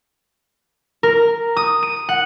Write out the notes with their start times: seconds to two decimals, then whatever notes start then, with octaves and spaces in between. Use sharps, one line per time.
1.03 A#4
1.57 D#6
1.83 D#7
2.09 F#5